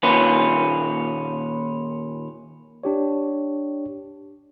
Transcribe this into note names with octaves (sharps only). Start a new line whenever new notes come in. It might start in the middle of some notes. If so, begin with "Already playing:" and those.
D#2 A#2 C#4 B4
D4 G4 C#5